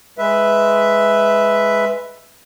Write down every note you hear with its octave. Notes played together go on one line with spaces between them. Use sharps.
G#3 B4 E5